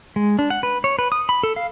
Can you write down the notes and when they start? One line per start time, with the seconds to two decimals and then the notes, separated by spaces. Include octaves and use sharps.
0.16 G#3
0.39 D4
0.50 F#5
0.63 B4
0.84 C#5
0.99 B4
1.12 D#6
1.29 B5
1.43 A4
1.56 F5